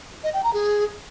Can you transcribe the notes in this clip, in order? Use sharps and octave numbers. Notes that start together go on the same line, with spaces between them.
D#5
G5
A#5
G#4